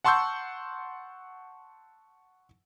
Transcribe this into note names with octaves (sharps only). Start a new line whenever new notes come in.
F#5 A5 C6 C#6 E6 G6